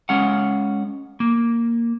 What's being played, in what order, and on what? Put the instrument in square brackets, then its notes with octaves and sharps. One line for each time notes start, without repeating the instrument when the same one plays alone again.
[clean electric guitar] G#3 C#4 F5 F#5
A#3